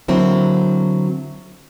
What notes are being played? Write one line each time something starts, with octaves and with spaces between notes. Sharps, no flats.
D3 F#3 A#3 C4 E4